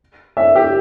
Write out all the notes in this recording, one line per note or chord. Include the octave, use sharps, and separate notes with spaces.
E5
G4